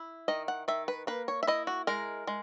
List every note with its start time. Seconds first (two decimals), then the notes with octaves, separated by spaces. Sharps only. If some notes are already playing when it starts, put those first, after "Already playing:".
Already playing: E4
0.28 D#3 D#5
0.48 F#5
0.68 D#3 E5
0.88 B4
1.07 A#3 B4
1.28 C#5
1.43 E5
1.47 E4 D#5
1.67 F#4
1.87 G#3 A#4
2.27 G#3